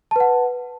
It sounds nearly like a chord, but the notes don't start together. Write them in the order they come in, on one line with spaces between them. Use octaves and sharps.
A5 B4 F#5